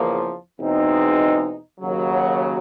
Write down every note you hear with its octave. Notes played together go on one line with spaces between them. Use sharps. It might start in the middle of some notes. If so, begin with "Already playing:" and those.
Already playing: E2 C#3 F3 A#3
E2 B2 G#3 C4 D#4
D#2 C#3 F#3